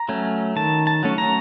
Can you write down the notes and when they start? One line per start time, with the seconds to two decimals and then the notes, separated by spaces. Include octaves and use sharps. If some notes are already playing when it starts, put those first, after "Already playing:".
Already playing: A#5
0.09 F#3 A3 C#4
0.56 D#3 A5
0.87 A5
1.03 F#3 A3 C#4
1.18 A#5